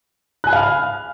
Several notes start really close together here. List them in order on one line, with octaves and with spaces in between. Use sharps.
F#6 G#5 B5 F5 F6